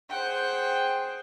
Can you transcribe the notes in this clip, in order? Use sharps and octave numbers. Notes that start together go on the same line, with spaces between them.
G#4 C5 F#5 G5